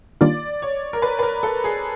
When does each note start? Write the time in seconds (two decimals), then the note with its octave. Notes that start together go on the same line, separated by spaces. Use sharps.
0.21 D#3 G3 A#3 D4 F4 D5
0.62 C#5
0.93 A#4
1.02 B4
1.19 B4
1.23 A#4
1.43 A4
1.64 G#4